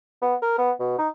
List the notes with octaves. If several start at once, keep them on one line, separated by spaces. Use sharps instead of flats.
B3
A#4
B3
B2
D#4